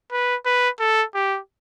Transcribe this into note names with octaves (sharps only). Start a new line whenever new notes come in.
B4
B4
A4
G4